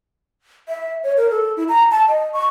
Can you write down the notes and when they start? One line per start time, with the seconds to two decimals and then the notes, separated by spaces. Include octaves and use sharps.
0.69 E5
1.03 C#5
1.17 A#4
1.30 A4
1.57 E4
1.69 A#5
1.91 A5
2.08 D#5
2.33 C#6